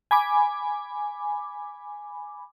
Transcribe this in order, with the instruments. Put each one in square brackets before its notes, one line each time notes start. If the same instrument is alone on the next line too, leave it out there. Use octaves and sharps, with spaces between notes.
[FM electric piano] G#5 B5 D6